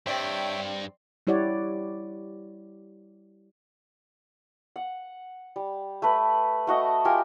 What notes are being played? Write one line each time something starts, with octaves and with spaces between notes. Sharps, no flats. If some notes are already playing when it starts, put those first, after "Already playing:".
G2 C4 C#5 D5 E5 G5
G3 E4 G4 C#5 D5 F#5
F#5
G3
A3 B4
A3 F#4 D#5
F4 G4 A#4 G#5